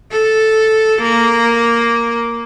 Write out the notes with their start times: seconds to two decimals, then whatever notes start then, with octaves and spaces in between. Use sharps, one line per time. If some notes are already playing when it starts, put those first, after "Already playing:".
0.12 A4
1.02 A#3